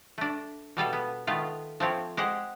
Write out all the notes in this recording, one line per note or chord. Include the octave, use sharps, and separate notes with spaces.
A3 D4
B2 G3 A4 F5
B3
D#3 A3 B3 F4
F3 A3 C4 C#5
G#3 G4 C5 F#5